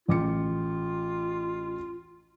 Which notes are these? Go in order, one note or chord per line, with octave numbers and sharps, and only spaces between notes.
A1 F4 D6 C#7